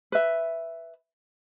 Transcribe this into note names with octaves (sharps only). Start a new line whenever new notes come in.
B4 E5